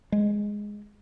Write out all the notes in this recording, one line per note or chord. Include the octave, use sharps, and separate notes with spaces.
G#3